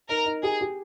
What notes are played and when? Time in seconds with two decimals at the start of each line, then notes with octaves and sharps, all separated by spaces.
0.09 D#4 A#4
0.26 D#4
0.43 G4 G#4
0.61 G4